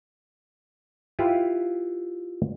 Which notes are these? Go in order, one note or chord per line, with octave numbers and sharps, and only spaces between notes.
E4 F4 G4 B4 F5